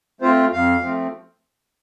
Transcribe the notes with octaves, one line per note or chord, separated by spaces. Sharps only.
A3 C4 F4 C5
F2 F5
F3 A3 C4